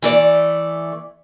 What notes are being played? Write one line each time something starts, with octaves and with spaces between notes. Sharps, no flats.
E3 A3 D5